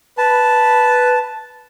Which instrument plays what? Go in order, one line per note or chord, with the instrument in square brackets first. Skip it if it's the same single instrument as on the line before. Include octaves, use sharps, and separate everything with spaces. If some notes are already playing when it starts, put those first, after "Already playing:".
[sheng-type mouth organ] B4 [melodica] A5